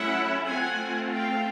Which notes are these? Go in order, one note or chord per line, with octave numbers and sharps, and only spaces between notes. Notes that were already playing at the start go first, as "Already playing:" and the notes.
Already playing: F#3 A3 C#4 E4 E5 F#5
A3 C4 F4 F#5 G#5
F5 G5